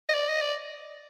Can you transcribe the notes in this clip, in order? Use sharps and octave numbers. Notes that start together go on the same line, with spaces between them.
D#5
D5
D#5
D5